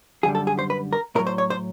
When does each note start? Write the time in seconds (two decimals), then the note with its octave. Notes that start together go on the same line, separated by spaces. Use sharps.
0.23 F#2 D3 G3 G#4
0.35 A4
0.47 G#4
0.59 C5
0.70 B4
0.93 A#4
1.15 A2 A#4
1.19 F#3
1.27 C5
1.38 C#5
1.50 C5